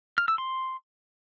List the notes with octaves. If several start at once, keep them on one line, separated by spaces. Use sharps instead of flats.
F6
E6
C6